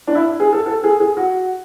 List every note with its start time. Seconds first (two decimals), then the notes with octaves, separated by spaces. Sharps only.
0.07 D4
0.15 E4
0.40 G#4
0.53 A4
0.66 A4
0.84 G#4
1.00 G#4
1.17 F#4